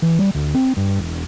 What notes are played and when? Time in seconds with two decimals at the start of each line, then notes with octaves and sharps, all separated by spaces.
0.02 E3
0.19 G3
0.35 D2
0.55 C4
0.77 G2
0.99 E1